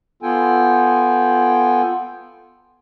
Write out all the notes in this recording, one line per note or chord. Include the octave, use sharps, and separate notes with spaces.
B3 F4 A4 G5 G#5